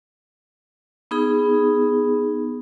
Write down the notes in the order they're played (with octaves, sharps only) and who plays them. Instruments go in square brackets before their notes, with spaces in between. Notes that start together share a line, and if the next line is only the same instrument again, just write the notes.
[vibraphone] B3 D#4 G#4